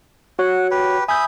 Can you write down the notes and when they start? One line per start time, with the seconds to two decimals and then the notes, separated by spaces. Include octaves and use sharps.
0.39 F#4 C#5 F#5
0.71 G4 B4
1.09 E5 G#5 B5 D#6 G6